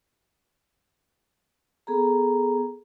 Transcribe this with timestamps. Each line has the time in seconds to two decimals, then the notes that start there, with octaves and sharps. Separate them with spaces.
1.87 B3 G#4 A4 A#5